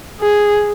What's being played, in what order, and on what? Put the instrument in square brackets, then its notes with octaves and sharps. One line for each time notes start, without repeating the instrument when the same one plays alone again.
[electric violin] G#4